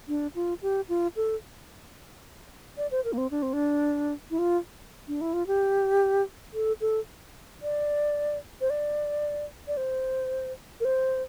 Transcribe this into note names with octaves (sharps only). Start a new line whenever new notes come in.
D4
F4
G4
F4
A4
D5
C5
A#4
A#3
C4
D4
C4
D4
E4
F4
D4
E4
F4
G4
A4
A4
D5
C5
D5
D5
C5
A#4
C5